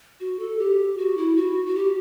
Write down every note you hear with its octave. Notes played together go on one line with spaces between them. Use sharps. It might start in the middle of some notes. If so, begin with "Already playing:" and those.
F#4
A4
G4
F#4
E4
F#4
F#4
G4